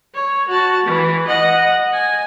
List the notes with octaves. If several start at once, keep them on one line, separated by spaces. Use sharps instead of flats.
C#5
F#4 A5
E3
D#5 F#5
G#5